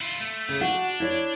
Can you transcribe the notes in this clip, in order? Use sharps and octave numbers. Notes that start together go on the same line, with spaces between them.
E4 F4
A3
C#3
D4 F#4 F#5
E4 C#5 D5